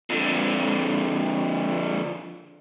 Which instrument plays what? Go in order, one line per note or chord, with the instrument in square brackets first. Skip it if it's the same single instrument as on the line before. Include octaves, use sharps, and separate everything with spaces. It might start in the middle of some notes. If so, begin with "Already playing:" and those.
[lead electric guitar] F2 D3